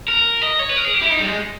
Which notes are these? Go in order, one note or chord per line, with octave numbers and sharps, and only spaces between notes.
A#4
D#5
C#5
B4
A#4
G#4
G4
E4
D#4
G3
G#3